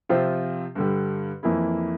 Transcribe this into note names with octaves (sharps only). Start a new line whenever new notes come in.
C3 F3 C4 F4 C5
G2 D3 G3
F2 E3 A#3 E4